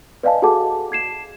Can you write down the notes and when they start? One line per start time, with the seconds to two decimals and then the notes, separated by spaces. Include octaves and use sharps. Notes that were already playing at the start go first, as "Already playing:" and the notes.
0.23 B4 D5 D#5 F5 G#5 A5
0.42 F#4 G#4 A4 F#5 A5 D6
0.91 A5 G#6 C7 E7